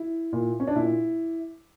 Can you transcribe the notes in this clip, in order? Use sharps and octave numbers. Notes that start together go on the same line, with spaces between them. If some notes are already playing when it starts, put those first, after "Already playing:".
Already playing: E4
A#2
C#4
D4
A#2 E4